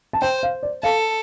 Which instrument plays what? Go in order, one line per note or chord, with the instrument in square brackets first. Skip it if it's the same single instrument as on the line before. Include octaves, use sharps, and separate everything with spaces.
[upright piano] A5
[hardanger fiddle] C5 [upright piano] G5
[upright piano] F5
D5
[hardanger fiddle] A4 [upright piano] F5